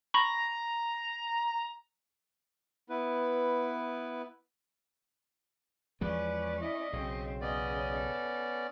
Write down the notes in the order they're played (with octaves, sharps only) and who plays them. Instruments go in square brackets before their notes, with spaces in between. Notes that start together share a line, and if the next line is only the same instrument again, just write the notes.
[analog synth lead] A#5 [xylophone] B5 C#6
[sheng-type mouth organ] B3 E4 B4
[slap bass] E2 F3 G#3 [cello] C#4 D5 [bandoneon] B4
[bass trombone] E4 [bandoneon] D#5
[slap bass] B1 [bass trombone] C#3 [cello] C4 C#4
[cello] E2 D#5 [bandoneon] B3 C#4 D5
[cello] A4